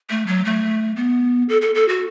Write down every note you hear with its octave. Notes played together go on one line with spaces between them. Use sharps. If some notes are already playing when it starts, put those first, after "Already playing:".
A3
F#3
A3
B3
A4
A4
A4
F#4